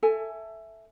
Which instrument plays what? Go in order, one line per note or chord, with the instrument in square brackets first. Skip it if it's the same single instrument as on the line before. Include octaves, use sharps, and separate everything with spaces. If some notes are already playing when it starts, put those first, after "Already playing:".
[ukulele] A4 E5 G#5